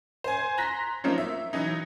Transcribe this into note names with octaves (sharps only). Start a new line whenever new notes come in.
C5 G#5
A#5 C6 F#6 A#6 B6
F3 F#3 A3 A#3 C4 D#4
E5
E3 F#3 D#4